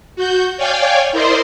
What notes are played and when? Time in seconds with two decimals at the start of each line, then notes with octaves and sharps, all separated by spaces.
0.16 F#4 G6
0.57 C#5 D5 F5 G5 G#5
1.12 E4 A#4 C5 D5 D#5 C6